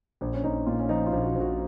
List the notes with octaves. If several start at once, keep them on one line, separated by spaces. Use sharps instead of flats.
A#1
C#4
A#1 D#4
A#2 F4
C#4
F3 D#4
F4
A#1
F#4
A#1
F#4